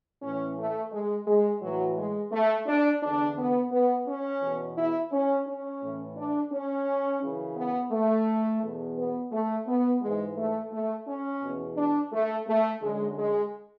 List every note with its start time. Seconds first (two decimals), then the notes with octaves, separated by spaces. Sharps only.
0.22 A2 E3 C#4
0.58 A3
0.92 G#3
1.27 G#3
1.62 A2 E3 F#3
1.97 G#3
2.32 A3
2.67 D4
3.02 E2 D3 D4
3.37 B3
3.72 B3
4.07 C#4
4.42 E2 B2
4.77 E4
5.12 C#4
5.47 C#4
5.82 A2 E3
6.17 D4
6.52 C#4
7.22 F#2 C#3 E3
7.57 B3
7.92 A3
8.62 E2 B2
8.97 B3
9.32 A3
9.67 B3
10.02 G#2 E3 G#3
10.37 A3
10.72 A3
11.07 C#4
11.42 E2 B2
11.76 D4
12.13 A3
12.47 A3
12.82 F#2 D3 G#3
13.17 G#3